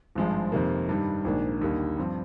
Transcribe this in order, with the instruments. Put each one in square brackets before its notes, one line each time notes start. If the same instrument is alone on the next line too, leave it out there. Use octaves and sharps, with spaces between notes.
[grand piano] G#1 G2 F3 G#3
F2 C3 D#3 A#3
G2 D#3 G3
A#1 G#2 D#3 A#3 D4
D#2 D3 G3 A#3
G2 F3 C4